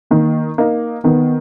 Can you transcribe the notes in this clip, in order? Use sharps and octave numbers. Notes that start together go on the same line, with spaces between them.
D#3 A#3
A#3 D#4
D#3 B3